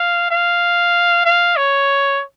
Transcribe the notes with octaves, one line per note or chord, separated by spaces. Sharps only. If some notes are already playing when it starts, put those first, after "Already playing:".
Already playing: F5
F5
F5
C#5